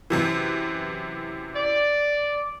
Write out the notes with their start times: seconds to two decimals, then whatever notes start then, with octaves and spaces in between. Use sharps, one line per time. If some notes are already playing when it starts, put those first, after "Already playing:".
0.10 F#2 C3 E3
1.55 D5